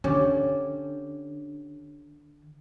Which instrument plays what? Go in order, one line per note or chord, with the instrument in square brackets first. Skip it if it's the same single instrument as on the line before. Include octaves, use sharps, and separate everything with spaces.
[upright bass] D3 [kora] C#4 G4 D5